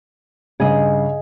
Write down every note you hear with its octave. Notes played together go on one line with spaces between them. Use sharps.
G2 C#3 G#4 D#5